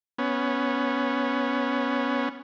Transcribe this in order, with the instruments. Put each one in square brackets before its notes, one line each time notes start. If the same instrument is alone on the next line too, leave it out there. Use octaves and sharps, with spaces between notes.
[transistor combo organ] B3 C#4